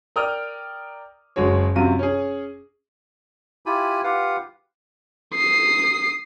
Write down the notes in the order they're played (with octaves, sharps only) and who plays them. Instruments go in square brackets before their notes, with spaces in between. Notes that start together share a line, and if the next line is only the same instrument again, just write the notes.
[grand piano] A#4 D5 G5 D#6 F6
F#1 G#3 F#4 G#4 C#5
F#2 C3 F4 F#4 D#7
C#4 G#4
[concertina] E4 F4 G4 G#5 B5
F4 G4 B4 F5 F#5
[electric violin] D#6 C7